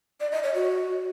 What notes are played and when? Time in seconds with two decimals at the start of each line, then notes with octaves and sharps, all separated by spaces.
0.20 D5
0.32 D#5
0.43 C#5
0.55 F#4